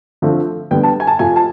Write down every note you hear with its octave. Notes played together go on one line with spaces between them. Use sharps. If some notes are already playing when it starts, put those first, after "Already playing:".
D3 F3 A3 C4
D3 G3 B3 G5
A5
G#5
A5
F2 C3 F3 A3 G#5
A5